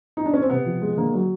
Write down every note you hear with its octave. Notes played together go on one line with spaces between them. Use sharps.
D#4
D4
C#4
C4
C3 B3
F3
G#3
D3 A#3
F#3